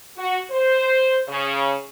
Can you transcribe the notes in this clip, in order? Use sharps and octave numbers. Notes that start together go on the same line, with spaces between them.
F#4
C5
C#3